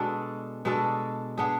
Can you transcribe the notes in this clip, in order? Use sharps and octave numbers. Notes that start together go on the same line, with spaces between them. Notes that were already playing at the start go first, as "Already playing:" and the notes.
Already playing: B2 G#3 D4 A4
B2 G#3 D4 A4
B3 D4 G#4